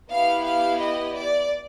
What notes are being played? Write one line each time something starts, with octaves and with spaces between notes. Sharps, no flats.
B3 E4 G4 F5
F5
D#5
D5